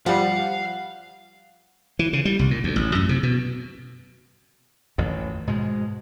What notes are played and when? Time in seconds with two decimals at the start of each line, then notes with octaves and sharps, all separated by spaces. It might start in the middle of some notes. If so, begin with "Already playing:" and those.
0.06 F3 G3 F5 F#5
1.99 E3
2.13 C#3
2.25 G3
2.39 C2
2.51 A#2
2.64 D2
2.76 A1
2.95 F#2
3.09 C3
3.23 B2
4.98 A1 F2 D#3
5.47 G#2 B2 G#3